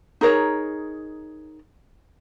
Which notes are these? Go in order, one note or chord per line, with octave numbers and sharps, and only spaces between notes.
D#4 G#4 A#4 C#5